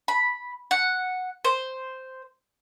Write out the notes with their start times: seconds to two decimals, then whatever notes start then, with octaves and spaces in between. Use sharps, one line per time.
0.08 B5
0.71 F#5
1.45 C5